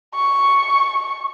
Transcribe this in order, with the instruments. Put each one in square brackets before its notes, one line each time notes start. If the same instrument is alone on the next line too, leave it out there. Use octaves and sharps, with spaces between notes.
[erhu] C#6